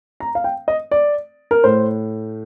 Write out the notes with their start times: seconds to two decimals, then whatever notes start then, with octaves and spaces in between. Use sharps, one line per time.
0.20 A#5
0.35 F5
0.44 G5
0.68 D#5
0.91 D5
1.51 A#4
1.64 A2 C5